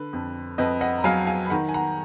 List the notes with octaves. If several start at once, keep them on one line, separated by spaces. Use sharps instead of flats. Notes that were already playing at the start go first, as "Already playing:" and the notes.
Already playing: D3 B4
F2
F2 B4 D#5
D#5 F#5
A#5
F#3 F5 G#5
F5 G#5
B5
D#3 F#5 A#5
G#5
F#5 A#5